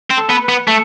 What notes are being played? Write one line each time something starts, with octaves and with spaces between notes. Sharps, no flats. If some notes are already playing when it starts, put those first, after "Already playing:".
C4
A4
B3
B4
B3
A3 A4